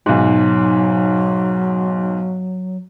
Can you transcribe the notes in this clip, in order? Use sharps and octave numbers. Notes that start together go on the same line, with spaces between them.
B1 G#2 F#3